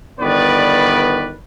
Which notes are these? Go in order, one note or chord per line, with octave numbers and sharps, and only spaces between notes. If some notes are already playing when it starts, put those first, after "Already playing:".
G1 D#3 B3 B4 D5